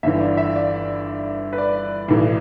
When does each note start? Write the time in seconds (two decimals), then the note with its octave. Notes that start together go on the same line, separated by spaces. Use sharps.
0.03 G1 G2 E3 E5
0.20 D5
0.37 E5
0.56 D5
1.53 B4
1.58 D5
2.08 B1 A2 E3